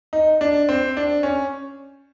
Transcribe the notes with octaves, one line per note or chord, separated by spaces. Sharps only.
D#4
D4
C4
D4
C#4